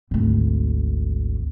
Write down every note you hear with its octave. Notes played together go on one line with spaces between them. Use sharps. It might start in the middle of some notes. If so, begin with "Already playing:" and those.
G#1 D2